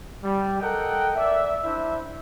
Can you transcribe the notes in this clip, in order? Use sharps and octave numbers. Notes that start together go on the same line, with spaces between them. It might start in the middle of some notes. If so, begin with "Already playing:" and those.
G3
A4 A#4 D#5 F#5 G5
D5 E5
D4 E4 C5 E5